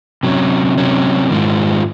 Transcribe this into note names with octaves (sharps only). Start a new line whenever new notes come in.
C3 F#3 C#4
C3 F#3 C#4
G#2 D#3 G#3 F4